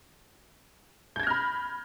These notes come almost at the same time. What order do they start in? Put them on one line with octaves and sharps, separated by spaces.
G6 G#6 A#6 F6 B5